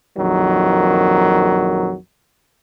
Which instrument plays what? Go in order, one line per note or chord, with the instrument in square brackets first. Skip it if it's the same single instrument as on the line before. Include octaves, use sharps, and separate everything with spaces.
[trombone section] A#1 F2 D#3 F#3